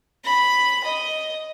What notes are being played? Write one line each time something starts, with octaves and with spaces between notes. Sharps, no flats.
B5
D#5